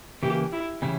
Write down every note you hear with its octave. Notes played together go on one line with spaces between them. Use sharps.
C#3 E3 A#3 G4
E4
C#3 E3 G3 C#4 E4